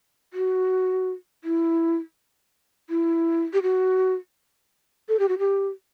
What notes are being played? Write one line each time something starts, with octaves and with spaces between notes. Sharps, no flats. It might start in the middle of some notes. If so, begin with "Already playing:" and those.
F#4
E4
E4
G4
F#4
A4
G4
F#4
G4